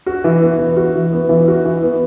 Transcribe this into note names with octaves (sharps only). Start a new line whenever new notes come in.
F#4
E3
B3
E3
F#4
E3
B3
E3
F#4
E3
B3